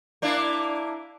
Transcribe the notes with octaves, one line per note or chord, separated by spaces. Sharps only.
A#3 D4 E4